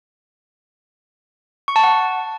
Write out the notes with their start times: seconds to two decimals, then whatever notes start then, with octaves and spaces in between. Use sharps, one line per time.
1.68 C#6
1.76 A5
1.83 F#5